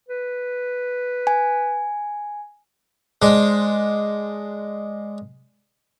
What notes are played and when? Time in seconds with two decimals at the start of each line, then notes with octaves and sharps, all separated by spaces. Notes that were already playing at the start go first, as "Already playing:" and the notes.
0.08 B4
1.27 G#5
3.22 G#3 D4 C5